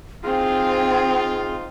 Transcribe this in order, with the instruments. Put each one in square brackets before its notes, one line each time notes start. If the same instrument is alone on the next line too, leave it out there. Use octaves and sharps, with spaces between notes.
[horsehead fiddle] C4 [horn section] D#4 F4 [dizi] G#4